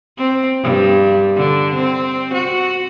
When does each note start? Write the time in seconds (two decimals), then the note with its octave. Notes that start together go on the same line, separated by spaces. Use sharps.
0.17 C4
0.62 G2
1.36 D3
1.75 C4
2.33 F#4